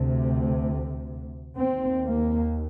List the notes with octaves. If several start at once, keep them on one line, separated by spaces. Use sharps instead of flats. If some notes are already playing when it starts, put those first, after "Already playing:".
Already playing: D2 C3
D#2 C4
A#3